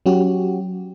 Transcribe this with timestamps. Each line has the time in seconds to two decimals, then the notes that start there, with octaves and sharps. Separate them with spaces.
0.06 F#3 C#4 F#4 G4